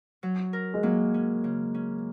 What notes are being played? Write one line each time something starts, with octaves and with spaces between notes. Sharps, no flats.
F#3
A#4
G#3
F#3 A#3
C#4
C#3
C#4